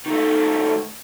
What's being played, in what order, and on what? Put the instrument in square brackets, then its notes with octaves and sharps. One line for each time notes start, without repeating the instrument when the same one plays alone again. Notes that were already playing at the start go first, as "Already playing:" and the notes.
[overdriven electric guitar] D#3 A3